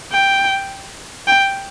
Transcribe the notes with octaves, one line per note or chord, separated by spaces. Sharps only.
G5
G5